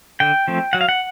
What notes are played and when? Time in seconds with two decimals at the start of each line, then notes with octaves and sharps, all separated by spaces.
0.20 D3 G5
0.48 F3 A3 C4
0.73 F#3 F#5
0.81 F5
0.89 F#5